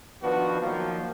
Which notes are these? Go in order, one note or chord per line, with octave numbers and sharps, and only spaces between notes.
D#3 F3 B3 D4 F#4 B4
D#3 F3 F#3 A#3